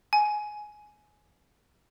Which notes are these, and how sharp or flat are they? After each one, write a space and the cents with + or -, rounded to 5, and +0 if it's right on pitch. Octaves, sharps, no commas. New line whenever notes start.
G#5 +15